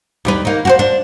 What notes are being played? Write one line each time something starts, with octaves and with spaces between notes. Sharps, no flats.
D#2 G3 B4
A#3 D#4
F#4 G4 C5
D4